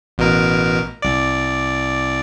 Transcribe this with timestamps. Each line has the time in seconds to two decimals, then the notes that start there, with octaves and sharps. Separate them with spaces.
0.18 A1 B2 A#4
1.02 C2 D5